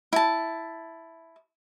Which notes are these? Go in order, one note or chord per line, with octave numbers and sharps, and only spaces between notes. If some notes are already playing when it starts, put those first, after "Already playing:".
E4 A5